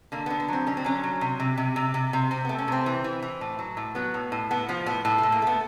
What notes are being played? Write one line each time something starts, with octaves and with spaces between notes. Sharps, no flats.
D3 A#3
D3 B3
B3
F#3 C4
D3 C#4
C4
F#3 C#4
F#3
C3
C3
C3
C3
C3
C3
C3 C4
A3 B3
C#4
C3 C4
E3
E3
E3
A2
F#3
A2
F#3 B3
A2
A2
A2 B3
F3 B3
A2 B3
A2
A3
A2
A#3
A3 B3